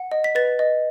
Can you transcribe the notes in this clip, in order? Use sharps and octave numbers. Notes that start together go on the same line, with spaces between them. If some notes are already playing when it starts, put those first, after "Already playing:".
Already playing: F#5
D#5
B6
B4 A6
D#5